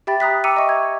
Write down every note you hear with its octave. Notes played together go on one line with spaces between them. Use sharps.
G4 E5 G5 B5 A6
A#5 D#6 F#6 B6
G5 A#5 D6 E6 C#7 D#7
D#5 E5 C#6
G#6